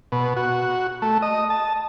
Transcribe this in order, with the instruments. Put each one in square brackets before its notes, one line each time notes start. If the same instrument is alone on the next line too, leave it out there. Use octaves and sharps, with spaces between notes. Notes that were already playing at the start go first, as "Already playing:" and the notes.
[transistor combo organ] B2
F#4
A3
D#5
A5